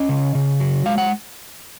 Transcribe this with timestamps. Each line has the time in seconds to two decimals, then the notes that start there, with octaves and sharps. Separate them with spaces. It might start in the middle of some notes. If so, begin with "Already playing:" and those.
Already playing: C#4 D#5
0.09 C#3
0.35 C#3
0.60 F#3
0.86 G#3 F5
0.98 F#5